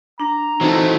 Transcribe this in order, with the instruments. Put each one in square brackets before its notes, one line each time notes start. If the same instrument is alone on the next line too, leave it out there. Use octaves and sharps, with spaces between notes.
[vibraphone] D4 [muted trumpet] A#5
[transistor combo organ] E3 C4 D#4 [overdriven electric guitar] F#3 A3 [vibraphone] C5